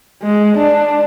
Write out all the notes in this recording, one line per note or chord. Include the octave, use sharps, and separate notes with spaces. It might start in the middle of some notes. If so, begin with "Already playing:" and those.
G#3
D4